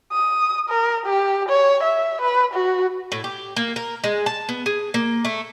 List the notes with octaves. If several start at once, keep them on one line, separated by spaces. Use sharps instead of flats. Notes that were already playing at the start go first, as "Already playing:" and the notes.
D#6
A#4
G4
C#5
E5
B4
F#4
A2
G4
A#3
A#4
G#3
A5
B3
G#4
A#3
A3